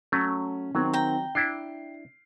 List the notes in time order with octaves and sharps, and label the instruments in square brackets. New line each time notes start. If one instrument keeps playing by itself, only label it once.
[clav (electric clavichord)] F#3 A3 [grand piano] C#4
[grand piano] D#3 C4 [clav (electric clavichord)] F#3
[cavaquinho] G5 A#5
[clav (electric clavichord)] D4 E4 [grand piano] C7 D7